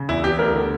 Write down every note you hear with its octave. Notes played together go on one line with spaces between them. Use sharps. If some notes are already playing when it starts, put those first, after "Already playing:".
Already playing: C#3
E2 E4
E2 G4
D2 A#4
D3